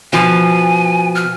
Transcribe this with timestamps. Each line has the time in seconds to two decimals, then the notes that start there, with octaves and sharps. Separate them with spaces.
0.13 B2 F3 G#5
1.15 F6